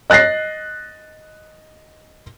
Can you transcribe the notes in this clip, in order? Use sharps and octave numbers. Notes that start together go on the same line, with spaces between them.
D#5 F#6 A6 A#6 C7